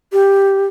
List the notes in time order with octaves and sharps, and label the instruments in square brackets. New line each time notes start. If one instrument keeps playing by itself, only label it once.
[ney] G4